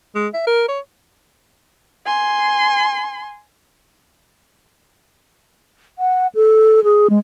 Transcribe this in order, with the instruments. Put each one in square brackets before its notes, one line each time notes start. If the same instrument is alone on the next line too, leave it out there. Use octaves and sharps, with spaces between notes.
[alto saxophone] G#3
E5
A#4
C#5
[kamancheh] G#5 C6
[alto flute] F#5
A4
G#4
G#3